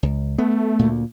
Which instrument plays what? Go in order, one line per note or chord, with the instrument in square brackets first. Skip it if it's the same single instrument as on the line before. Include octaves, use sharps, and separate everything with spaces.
[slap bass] C#2
[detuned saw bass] A3 [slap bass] B3
[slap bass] D2 A#2